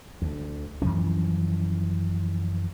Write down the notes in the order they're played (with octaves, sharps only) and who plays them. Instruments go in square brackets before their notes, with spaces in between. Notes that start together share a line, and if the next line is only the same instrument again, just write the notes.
[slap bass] D2
F#2 E3 F3 C#4